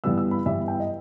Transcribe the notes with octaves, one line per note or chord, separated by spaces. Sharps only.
G2 E3 G3 B3 E6
E6
B5
G2 E3 G3 B3 E5
G5
D#5